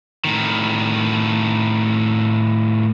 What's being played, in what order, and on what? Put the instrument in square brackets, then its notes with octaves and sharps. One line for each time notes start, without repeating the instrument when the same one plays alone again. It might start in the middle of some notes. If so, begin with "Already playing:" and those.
[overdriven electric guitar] A2 D#3